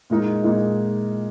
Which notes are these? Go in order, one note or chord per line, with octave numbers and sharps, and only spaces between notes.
A#2 G#3 D#4 A#4
A#2 G#3 D#4 A#4